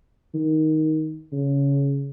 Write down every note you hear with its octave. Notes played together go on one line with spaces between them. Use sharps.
D#3
C#3